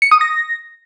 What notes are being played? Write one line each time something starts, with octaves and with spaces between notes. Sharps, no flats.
C#7
D#6
A#6